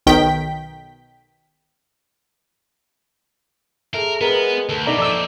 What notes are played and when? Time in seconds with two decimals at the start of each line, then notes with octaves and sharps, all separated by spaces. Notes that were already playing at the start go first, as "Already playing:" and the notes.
0.06 B1 D#3 G5 B6
3.94 A3 G#4 A#4 E5
4.21 G#3 B3 A#4 B4
4.69 D2 A4
4.86 B2 A3 D#4 D5 A#5
4.99 F2 A#2 D5 E6